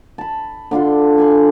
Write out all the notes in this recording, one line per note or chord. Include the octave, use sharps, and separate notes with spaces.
A5 B5
D3 D4 F4 C6
G#5 B5 C6